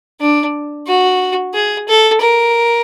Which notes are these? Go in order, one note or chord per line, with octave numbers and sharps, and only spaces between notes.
D4
F#4
G#4
A4
A#4